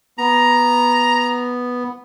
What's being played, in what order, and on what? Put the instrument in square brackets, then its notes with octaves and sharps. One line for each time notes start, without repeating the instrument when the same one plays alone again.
[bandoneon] B3 [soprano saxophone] A#5